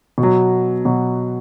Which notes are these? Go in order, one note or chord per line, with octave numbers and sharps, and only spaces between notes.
B2
F#3
B2 F#3